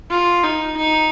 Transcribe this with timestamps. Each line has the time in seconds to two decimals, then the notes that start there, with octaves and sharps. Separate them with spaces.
0.10 F4
0.43 D#4
0.77 D#4